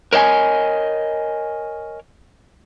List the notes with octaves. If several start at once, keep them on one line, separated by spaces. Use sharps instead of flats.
A#4 C#5 D#5 G5 G#5